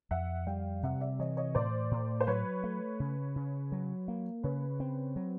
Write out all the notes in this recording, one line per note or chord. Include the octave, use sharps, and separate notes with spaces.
F2 E5 F#5
G3 F5 G5
C3 E5 F#5
D5 E5
E3 C#5 D#5
C#5 D#5
A2 C5 D5
A2
C5
F#3 B4 C#5
A3
C#3
C#3
F#3
A#3
C#3 B4 C#5
C4
F#3